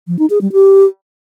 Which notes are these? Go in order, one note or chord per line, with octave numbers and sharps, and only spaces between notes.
F3
D#4
G#4
G3
G4